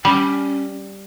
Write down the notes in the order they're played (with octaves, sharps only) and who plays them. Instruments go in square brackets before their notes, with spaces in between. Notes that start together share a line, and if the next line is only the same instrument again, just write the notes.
[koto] G3 [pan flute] C#4